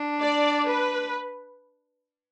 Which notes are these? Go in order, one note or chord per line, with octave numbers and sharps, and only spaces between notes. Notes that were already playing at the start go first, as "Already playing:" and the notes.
Already playing: D4
D5
B4